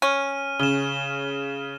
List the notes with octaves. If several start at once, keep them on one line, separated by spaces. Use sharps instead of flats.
C#4 F6 D#7
C#3 E7 G7